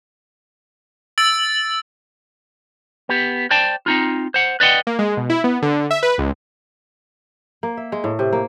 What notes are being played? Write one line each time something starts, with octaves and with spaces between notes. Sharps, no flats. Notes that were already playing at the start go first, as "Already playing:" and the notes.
E6 A6 D7 F#7
B3 G4
C5 D5 G5 A5
C4 D#4 F4
C5 F#5
B4 D5 D#5 F#5 G5
A#3
G#3
B2
E4
B3
D3
E5
B4
C#2
A#3
E5
G#3
A2
C3
A#3